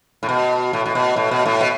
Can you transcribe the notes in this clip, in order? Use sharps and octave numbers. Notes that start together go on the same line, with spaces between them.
A2
B2
A2
A2
B2
A2
B2
A2
B2